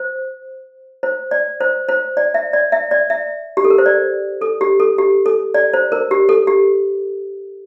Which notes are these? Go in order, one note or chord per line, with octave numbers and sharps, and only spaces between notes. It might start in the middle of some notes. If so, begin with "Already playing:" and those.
Already playing: C5
C5
D5
C5
C5
D5
E5
D5
E5
D5
E5
G4
A4
A#4
C5
D5
A4
G4
A4
G4
A4
D5
C5
A#4
G4
A4
G4